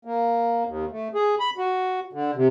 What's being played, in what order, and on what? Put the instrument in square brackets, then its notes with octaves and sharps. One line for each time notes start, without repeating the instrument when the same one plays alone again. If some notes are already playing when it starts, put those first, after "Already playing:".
[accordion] A#3
D#2
A3
G#4
B5
F#4
D3
C3